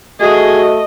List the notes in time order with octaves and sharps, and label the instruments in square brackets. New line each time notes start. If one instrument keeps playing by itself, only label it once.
[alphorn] A3 [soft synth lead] F#4 [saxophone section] G#4 [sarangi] D#5